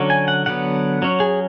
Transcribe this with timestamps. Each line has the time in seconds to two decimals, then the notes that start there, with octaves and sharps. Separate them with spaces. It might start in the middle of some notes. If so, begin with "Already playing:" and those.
Already playing: D3 F#3 C#4
0.10 G#5
0.28 F#5
0.46 D3 F#3 B3 F#5
1.02 F#3 C#4
1.20 G#4